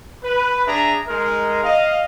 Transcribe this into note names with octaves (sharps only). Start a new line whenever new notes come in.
B4
D4 G#4 E5 A#5
G#3 D#4 A#4
D#5 F5